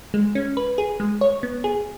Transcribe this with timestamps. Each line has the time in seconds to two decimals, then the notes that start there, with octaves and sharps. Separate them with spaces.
0.14 G#3
0.35 C#4
0.57 B4
0.78 G#4
1.00 G#3
1.21 C#5
1.43 B3
1.64 G#4